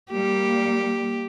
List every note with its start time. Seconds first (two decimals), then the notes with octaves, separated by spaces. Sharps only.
0.12 G3 A#3 G4